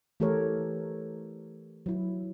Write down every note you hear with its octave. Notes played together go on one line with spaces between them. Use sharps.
E3 A3 G4 A4 A#4 C#5
F#3 E4